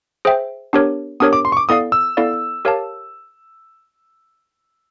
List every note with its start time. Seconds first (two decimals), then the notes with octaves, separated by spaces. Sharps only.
0.25 G#4 C5 E5 G5
0.73 B3 D4 G4 A#4 C#5
1.20 B3 D4 G4 A#4 C#5 D#6
1.33 D6
1.45 C6
1.52 C#6
1.57 D6
1.69 B3 E4 A4 D5 F5 D#6
1.92 E6
2.17 B3 E4 A4 D5 F5
2.65 G4 A#4 C#5 F5 A5